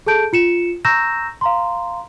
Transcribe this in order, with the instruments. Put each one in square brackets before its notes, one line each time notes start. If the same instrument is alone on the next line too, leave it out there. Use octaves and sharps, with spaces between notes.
[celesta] G#4 A4 A5 G6 D7
F4 C#7 E7
A#5 C#6 E6 G6 A#6 E7
F5 A#5 C6